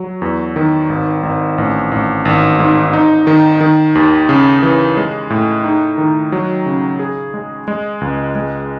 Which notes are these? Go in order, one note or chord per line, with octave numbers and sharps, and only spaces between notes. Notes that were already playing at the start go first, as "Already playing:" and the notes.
Already playing: F#3
E2
D#3
G#1
G#1
A1
A1
G#1
G#2
D#4
D#3
D#3
D#2
C#3
E3
G#3
A2
D#4
D#3
F#3
C#3
G#4
G#3
G#3
C#2
G#3